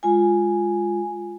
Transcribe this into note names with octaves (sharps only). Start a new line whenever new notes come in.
G#3 F4 G#5